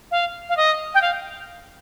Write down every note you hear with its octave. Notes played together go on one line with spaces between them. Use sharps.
F5
F5
D#5
G5
F5